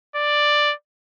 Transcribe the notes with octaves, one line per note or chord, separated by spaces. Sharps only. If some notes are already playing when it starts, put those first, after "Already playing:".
D5